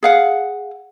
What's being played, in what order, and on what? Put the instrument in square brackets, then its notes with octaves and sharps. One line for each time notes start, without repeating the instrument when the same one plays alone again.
[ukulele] G#4 F5 F#5